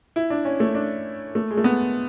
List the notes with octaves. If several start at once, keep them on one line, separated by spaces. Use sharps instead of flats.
E4
D4
C#4
A3
D4
A3
G#3
A3
B3